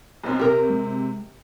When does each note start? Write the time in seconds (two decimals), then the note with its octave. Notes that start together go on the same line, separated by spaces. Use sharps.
0.23 B1 F#3 C4
0.39 C3 G4 A#4
0.70 G#3